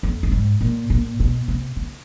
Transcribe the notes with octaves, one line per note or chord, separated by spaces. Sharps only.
F2
G2
G#2
A#2
A#2
B2
C3
C#3